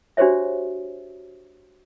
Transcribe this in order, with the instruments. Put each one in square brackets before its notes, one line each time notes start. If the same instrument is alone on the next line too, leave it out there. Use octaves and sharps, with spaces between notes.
[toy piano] D4 F#4 G4 C5 C#5 E5